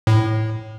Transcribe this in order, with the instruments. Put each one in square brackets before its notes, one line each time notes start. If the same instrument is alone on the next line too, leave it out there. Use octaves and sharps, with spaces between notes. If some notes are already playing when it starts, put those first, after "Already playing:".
[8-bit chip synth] A2